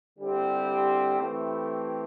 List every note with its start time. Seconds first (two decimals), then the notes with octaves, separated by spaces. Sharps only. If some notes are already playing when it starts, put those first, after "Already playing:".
0.19 D3 G3 C4 E4 G4
1.20 E3 A3 C4 E4 G4